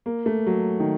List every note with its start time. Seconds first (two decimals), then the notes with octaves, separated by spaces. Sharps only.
0.06 A#3
0.26 A3
0.46 F#3
0.80 D#3